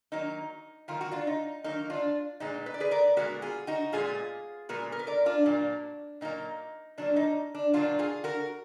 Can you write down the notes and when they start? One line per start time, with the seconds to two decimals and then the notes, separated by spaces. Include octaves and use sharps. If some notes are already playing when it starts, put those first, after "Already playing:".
0.12 D#3 F#3 A#3 D#4
0.88 D#3 F#3 A#3 F4
1.01 F#4
1.11 D4 F4
1.27 D#4
1.64 D#3 F#3 A#3 D#4
1.90 D4 F4
2.40 A#2 G#3 B3 D#4
2.66 B4
2.74 D5
2.80 G#4 B4
2.91 A#4 D5
3.16 A#2 G#3 B3 F#4 A#4
3.42 F4 G#4
3.67 D#4 F#4
3.92 A#2 G#3 B3 F4 G#4
4.69 A#2 G#3 B3 F#4 A#4
4.92 A#4
4.99 B4
5.07 A#4 D5
5.26 D4 F4
5.46 A#2 F#3 A#3
6.21 A#2 F#3 A#3 D#4
6.98 A#2 F#3 A#3 D4
7.16 D#4
7.55 D4
7.74 A#2 F#3 A#3 D4 F4
7.99 F4 G#4
8.24 F#4 A#4